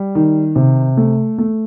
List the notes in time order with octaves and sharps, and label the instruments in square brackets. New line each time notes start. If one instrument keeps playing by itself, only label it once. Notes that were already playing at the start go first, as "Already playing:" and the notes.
Already playing: [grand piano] G3
D#3
C3
A3
A3